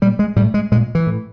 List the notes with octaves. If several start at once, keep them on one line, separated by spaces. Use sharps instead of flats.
A#2 G3
G#3
A2 G3
G#3
A#2 G#3
E3
A2